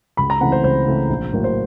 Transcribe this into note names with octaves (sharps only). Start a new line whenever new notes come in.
C#2 B5
A#5
C#3 E3 A3 C4 F#5
C5
C#2 C5
C#3 E3 A3 C4
A#1
A2 F#3 A#3
C5